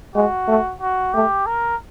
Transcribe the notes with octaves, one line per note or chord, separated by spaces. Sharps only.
G#3 F#4
A3
F#4
A3 G4
A#4